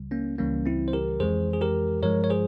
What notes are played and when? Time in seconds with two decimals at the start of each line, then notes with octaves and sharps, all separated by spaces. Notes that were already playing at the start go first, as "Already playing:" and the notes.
Already playing: C#2 C#3 G3
0.11 A#3 C#4
0.38 C#2 C#3 E3 G3 A#3 C#4
0.66 C4 E4
0.88 C5
0.93 G4 A#4
1.20 F2 E3 G#3 G#4 C5
1.53 G#4
1.61 G4 A#4
2.02 G2 F3 G#3 A#4 C#5
2.24 C#5
2.30 G#4 C5